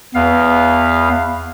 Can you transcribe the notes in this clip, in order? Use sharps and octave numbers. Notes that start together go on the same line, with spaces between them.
E2 B3 F5